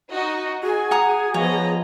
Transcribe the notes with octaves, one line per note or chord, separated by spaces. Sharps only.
D#4 F#4 D#5
F#4 G#4 G#5
F#5 A#5 D#6
F3 B3 C#5 D#5 A#5